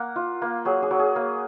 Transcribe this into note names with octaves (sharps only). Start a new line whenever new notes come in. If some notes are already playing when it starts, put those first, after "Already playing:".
Already playing: A#3 F#5
F4
A#3
F#3 G#4
G#4
F#3
G#4
A#3